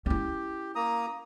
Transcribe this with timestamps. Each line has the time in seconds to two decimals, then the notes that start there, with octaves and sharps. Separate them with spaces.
0.06 C#4 E4 G4
0.75 A#3 A#5 D#6